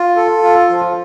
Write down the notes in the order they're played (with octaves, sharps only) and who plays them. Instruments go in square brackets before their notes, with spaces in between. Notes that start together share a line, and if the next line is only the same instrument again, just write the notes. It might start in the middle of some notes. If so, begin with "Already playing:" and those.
Already playing: [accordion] F4
A4
F4
F3